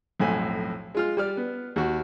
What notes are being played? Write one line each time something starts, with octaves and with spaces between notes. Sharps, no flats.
B1 F2 A2 G#5
G#3 F4 F6
G3 D5 F6
B3
D#2 F#4